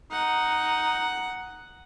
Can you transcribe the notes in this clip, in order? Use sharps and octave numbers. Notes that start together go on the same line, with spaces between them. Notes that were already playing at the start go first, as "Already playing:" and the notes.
D#4 F#5